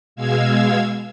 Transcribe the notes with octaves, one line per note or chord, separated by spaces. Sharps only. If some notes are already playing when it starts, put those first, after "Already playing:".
B2 G#3 F5 E6 G#6